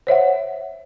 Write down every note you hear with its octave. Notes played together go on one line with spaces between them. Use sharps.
C5 C#5 E5 F#5